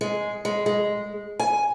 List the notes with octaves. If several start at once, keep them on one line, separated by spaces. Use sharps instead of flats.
G#3
G#3
G#3
G#5